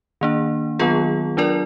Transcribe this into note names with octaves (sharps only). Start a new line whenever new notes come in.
D#3 A#3 D4
D#3 F#3 B3 F4 G#4
F#3 D4 F4 A#4 D5